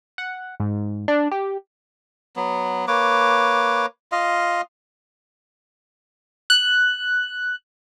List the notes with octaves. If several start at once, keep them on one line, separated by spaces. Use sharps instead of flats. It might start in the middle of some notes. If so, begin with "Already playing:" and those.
F#5
G#2
D4
G4
F#3 B3
A#3 B4 C#5 D6
F4 D#5 F5
F#6